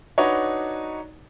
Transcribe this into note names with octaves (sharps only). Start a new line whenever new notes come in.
D4 D#4 F#4 B4 C#5 D5